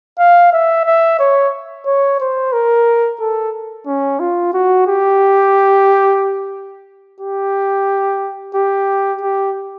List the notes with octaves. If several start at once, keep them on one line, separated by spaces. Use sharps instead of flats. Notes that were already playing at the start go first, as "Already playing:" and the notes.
F5
E5
E5
C#5
C#5
C5
A#4
A4
C#4
F4
F#4
G4
G4
G4
G4